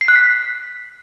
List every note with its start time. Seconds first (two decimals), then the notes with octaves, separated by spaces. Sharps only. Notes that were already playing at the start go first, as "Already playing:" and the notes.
0.01 C7
0.08 F#6
0.16 B6